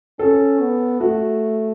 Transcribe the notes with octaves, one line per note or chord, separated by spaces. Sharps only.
C#4 A4
B3
A3 F#4